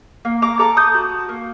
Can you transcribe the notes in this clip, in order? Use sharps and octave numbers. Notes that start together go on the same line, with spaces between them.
A#3
A#5 D6
A4 A#5 D6
D#6 G6
F#4
A#3